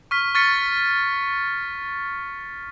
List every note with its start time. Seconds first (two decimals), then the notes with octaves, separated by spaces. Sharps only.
0.11 C#6 F6 B6
0.35 C#6 F6 A6 B6 C#7